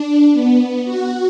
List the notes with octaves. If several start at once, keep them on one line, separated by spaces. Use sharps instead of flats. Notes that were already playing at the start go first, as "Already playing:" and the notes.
Already playing: D4
B3
F#4